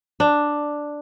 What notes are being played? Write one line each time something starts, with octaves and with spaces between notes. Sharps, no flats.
D4